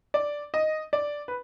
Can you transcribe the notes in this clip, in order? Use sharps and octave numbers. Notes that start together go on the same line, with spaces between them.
D5
D#5
D5
B4